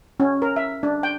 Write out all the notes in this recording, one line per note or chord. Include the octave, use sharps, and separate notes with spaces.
C#4
A#4
E5
D4
G5